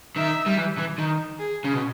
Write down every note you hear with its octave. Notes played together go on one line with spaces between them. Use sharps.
D#3 E5
G3
E3
E3
D#3
G#4
C#3
B2